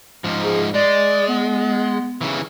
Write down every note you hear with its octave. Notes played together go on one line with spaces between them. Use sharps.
G#2 F3
G#4
G#3 D5
B3
C#3 E3